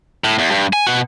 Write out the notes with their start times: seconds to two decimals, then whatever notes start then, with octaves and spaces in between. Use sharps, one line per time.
0.24 A2
0.39 E2
0.51 G2
0.73 G#5
0.87 B2 F#4